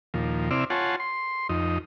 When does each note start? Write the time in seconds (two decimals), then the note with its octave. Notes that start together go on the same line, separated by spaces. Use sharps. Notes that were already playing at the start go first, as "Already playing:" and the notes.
0.14 D#2 A#2 F3
0.51 C3 C4 E4 D5 F6
0.70 F4 C#5 F#5 G#5 A5 C6
1.00 C6
1.49 F2 D#4